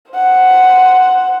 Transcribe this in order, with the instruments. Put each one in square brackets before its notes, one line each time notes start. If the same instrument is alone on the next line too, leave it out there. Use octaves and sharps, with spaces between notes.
[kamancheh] C5 F#5